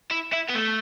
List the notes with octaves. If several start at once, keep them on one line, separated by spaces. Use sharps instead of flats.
E4
E4
B3
A3